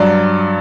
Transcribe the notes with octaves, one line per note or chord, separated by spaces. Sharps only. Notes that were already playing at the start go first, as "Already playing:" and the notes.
Already playing: G2 F#3 D5